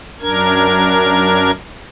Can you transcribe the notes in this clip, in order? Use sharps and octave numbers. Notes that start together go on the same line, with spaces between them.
F#2 D4 A#4 G#6